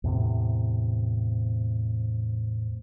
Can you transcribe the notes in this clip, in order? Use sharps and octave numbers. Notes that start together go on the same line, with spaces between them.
E2 A2 C3